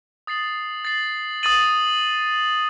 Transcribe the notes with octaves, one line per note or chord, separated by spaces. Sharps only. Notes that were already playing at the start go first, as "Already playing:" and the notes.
D#6 A6 C7 F#7
A6 C7 F#7
D#6 A6 D#7 F#7